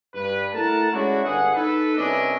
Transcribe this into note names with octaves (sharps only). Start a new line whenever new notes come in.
G2 B4
A3 E4 A#4 F#5 A5
G#3 C#4 D4 E4 F#4
G1 G#4 F#5
D#4 A4 B4
C2 B3 C#4 D4 E4 D#5